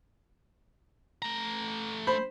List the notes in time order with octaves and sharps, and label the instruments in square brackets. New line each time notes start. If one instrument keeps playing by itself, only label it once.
[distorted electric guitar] A3 A#5
[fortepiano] C5 B5